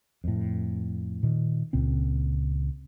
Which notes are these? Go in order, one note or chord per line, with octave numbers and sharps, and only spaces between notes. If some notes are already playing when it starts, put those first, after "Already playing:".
F2 A2
A#2 D#3
C#2 A#2 C4